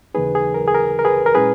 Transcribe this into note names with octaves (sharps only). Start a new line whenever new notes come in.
D#2 C#3 E3 A#3 D#4 G#4 B4
G#4
A#4
G#4
A#4
A#4
G#4 B4
A#4
A#2 G#3 C#4 E4 G#4 B4